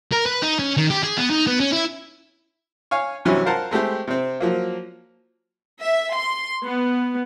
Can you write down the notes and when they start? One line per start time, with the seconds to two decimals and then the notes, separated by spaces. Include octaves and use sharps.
0.13 A#4
0.26 B4
0.42 D#4
0.59 C#4
0.77 D#3
0.90 G4
1.04 G#4
1.17 B3
1.30 D#4
1.47 B3
1.60 C#4
1.72 E4
2.91 C#5 F5 G#5
3.25 G2 C3 E3 F#3 C#4 F#4
3.45 F4 A#4 C5 F#5 A5 A#5
3.71 G#3 A3 C4 G4
4.07 C3 C4
4.41 F3 F#3 A#3
5.82 E5
6.15 C6
6.63 B3